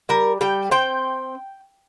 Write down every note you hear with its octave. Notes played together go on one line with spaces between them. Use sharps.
G3 A#4
G3 G5
C4 G5